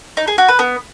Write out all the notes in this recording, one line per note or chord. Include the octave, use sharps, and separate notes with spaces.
D#4
G#4
F#4
B4
B3